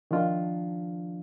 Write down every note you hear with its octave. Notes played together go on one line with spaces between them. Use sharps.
D#3 F3 D4 F4